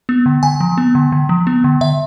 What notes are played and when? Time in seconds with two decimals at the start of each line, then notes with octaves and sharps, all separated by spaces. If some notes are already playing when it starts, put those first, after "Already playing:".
0.09 B3
0.26 D3
0.43 D3 G#5
0.60 F3
0.78 B3
0.95 D3
1.12 D3
1.29 F3
1.47 B3
1.64 D3
1.81 D3 E5